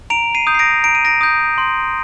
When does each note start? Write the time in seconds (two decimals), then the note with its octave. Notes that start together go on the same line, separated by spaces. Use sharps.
0.10 A#5 D7 F7
0.35 C7 D#7
0.47 D#6 G6
0.54 C7
0.59 A#6 D7
0.84 A#5 D7
0.95 D#7
1.05 A#6 D7
1.21 D#6 G6
1.58 C6